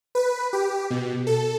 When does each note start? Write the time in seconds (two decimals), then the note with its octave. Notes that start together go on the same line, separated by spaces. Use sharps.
0.15 B4
0.53 G4
0.90 B2
1.27 A4